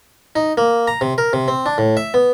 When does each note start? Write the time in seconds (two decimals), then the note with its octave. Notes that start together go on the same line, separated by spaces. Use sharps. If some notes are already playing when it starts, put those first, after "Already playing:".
0.36 D#4
0.57 A#3
0.87 A#5
1.01 C3
1.18 A#4
1.33 C3
1.48 C4
1.66 D4
1.78 A2
1.97 E5
2.14 B3